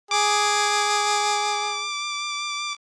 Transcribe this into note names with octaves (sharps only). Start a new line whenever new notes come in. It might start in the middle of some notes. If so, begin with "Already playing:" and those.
G#4 D6